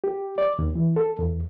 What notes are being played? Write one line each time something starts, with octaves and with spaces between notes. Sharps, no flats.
G4
D5
D#2
E3
A4
E2